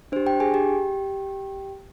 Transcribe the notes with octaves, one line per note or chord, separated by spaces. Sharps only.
D4 G4 C5
G4 G5
G#4 G#5
G4 G5